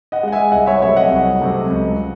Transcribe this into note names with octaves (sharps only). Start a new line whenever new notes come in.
D#5 F#5
G#3 F#5
E5 G#5
C2 D#5 F#5
C#5 E5
C3 F#3 A3 C#5 E5
D#5 F#5
C2
C3 F#3 A3
C#2